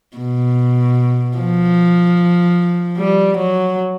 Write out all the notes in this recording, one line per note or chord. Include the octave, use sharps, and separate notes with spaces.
B2
F3
G3
F#3